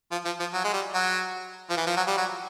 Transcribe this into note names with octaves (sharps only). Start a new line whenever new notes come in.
F3
F3
F3
F#3
G#3
G3
F#3
F3
E3
F3
F#3
G3
F#3